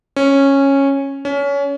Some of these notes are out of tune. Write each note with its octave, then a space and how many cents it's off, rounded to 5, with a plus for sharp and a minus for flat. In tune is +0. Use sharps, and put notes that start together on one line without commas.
C#4 -10
C#4 +25